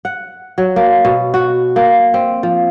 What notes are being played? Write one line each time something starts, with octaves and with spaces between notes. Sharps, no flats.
F#5
F#3
A#3
B2
F#4
A#3
C4
F3